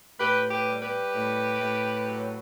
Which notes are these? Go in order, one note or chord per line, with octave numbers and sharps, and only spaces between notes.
A2 G4 B4
G4 B4
G3
G4 B4
A2
A2
F#3